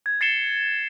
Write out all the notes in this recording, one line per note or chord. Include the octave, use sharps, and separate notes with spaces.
G#6
A6 C7 C#7 E7 G7